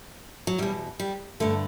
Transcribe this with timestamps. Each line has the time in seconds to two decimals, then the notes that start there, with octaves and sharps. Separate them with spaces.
0.47 F#3
0.58 E2 B2 G3
1.00 G3
1.40 G2 D3 A3